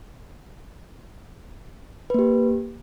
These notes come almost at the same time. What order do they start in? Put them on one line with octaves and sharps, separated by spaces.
B4 A#3 G4